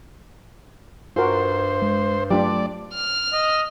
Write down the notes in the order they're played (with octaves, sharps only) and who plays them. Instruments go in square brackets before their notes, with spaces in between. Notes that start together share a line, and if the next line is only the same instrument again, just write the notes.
[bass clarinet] G2 [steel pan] F4 F#4 A#4 [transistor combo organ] C5
[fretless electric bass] G#3
[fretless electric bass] F#3 A3 [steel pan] D4 F4 G4 [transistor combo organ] D5
[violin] F6
[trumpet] D#5